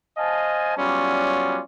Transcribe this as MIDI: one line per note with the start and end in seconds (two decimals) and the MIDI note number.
0.18 0.76 72
0.18 0.76 75
0.18 0.76 77
0.18 0.76 80
0.18 0.76 81
0.78 1.61 54
0.78 1.61 55
0.78 1.61 59
0.78 1.61 61
0.78 1.61 65
0.78 1.61 74